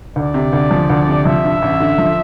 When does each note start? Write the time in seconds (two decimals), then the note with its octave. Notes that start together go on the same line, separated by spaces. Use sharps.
0.16 D2 D5
0.34 C3
0.53 D2
0.71 F3
0.90 D2
1.07 C3
1.25 F3 E5
1.44 G2
1.62 A1
1.80 D3
1.98 F3